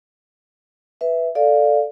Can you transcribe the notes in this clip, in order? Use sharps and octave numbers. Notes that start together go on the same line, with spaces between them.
B4 E5
A4 D5 F5